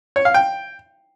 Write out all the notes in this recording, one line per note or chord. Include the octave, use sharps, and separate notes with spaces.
C#5
F5
G5